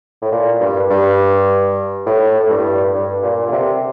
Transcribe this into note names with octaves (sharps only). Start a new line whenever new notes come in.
A2
A#2
G2
G2
A2
A2
G2
G2
A#2
D3
C3